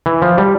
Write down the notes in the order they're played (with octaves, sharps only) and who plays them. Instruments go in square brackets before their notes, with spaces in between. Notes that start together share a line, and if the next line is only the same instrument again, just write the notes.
[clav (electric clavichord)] E3
F3
G3